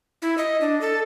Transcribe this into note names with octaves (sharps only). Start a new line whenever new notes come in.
E4
D#5
D4
A4